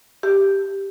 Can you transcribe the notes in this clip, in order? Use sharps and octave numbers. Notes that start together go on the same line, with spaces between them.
G4